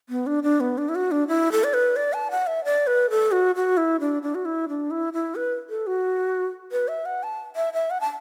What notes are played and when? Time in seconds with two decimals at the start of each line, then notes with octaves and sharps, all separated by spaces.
0.09 B3
0.27 D4
0.43 D4
0.60 B3
0.78 D4
0.89 E4
0.95 F#4
1.11 D4
1.28 E4
1.52 A4
1.64 D5
1.74 B4
1.96 D5
2.13 A5
2.31 F#5
2.47 E5
2.65 D5
2.87 B4
3.10 A4
3.32 F#4
3.55 F#4
3.77 E4
4.00 D4
4.23 D4
4.35 F#4
4.45 E4
4.69 D4
4.91 E4
5.13 E4
5.35 B4
5.69 A4
5.87 F#4
6.72 B4
6.88 E5
7.06 F#5
7.23 A5
7.56 E5
7.74 E5
7.91 F#5
8.01 A5